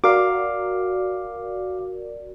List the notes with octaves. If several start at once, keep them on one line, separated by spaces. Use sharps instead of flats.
F#4 A#4 D5 F5 D6